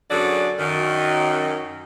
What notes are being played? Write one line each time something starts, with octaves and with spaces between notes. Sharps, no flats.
F#2 D3 F#3 G#4 D5
F#2 D#3